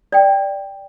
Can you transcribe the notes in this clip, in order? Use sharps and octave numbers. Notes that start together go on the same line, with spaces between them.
D5 G5